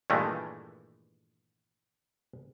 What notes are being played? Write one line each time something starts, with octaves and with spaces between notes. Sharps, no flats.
G2 A#2 D#3 E3 G#3 A3